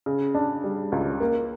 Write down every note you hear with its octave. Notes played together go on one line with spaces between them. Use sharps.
C#3
D4
G3
C#2
A#3